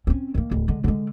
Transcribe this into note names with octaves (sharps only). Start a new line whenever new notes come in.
C4 C#4
D#3 A#3
D1
D3 G#3
D3 G#3